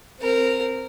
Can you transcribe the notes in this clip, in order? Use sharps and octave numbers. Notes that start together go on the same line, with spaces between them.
C4 A#4